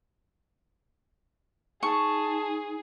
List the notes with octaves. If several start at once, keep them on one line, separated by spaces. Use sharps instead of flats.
D#4 G#4 A5 C#6